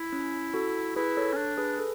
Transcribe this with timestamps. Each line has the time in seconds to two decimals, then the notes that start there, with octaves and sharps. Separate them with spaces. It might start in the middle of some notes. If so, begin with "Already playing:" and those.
Already playing: E4
0.13 C#4
0.54 F#4 A4
0.96 E4 G#4 B4
1.17 A4 C#5
1.33 C#4
1.37 D4
1.58 G#4 B4
1.79 A4